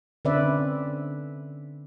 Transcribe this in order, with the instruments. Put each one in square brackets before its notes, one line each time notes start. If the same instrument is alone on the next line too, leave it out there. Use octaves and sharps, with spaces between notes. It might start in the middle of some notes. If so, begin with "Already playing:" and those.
[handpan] D3 C4 C#4 B4 D5 E5